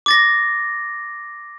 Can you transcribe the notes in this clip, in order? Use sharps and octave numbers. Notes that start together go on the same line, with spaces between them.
D6 A6 A#6